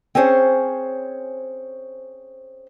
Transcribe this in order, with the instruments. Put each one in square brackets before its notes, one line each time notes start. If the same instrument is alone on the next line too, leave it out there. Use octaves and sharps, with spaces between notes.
[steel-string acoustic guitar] C4 C#4 G#4 C5 C#5